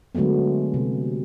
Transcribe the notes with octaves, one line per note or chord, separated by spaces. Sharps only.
D3 F#3 G#3 A3 B3
C3